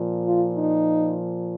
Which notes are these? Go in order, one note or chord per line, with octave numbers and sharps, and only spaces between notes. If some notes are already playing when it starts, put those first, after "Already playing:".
Already playing: A#2 F3
F4
D#4